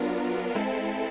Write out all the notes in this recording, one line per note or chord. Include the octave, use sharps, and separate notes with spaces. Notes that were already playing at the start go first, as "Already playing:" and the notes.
Already playing: F#3 B3 D4 F4 A#4
G#3 C4 E4 A4